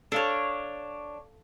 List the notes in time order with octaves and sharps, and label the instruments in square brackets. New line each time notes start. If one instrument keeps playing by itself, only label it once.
[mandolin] D4 C#5 [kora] A4 F5